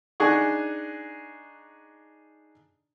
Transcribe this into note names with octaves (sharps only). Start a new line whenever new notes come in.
D4 D#4 G#4 F#5 G#5 C#6